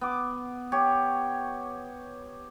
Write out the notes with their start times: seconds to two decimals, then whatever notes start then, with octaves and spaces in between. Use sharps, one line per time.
0.01 B3 D6
0.72 G4 C#5